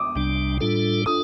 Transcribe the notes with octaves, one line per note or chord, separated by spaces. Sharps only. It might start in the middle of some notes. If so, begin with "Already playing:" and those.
Already playing: D6 D#6
C2 C3 G3 D4
A2 G3 D4 F4 A4
D4 F4 A4 D#6